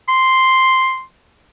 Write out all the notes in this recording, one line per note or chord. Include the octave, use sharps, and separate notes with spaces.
C6